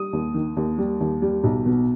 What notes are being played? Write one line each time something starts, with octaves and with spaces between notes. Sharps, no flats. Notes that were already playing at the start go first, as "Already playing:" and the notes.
Already playing: G3 D#6
D#2
D#3
D#2
G3
D#2
G3
B1
B2